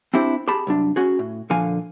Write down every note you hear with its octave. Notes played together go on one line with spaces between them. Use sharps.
C4 D4 E4 G4 C5
G4 G#4 A5 B5
C2 F#2 D4
C#4 F#4 G#4
A2
A#2 D3 F3 F5 G#5